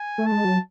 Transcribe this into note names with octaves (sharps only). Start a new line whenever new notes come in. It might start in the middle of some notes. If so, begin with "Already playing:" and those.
Already playing: G#5
A3
A5
G#3
F#3